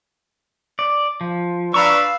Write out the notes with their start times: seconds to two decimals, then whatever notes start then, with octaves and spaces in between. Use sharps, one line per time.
0.79 D5
1.21 F3
1.74 D4 B4 F5 A#5 C#6 E6
1.92 F5